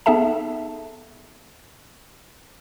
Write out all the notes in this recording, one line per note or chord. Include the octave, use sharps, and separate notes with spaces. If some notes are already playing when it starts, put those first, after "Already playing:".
B3 D#4 G#4 A4 E5 A5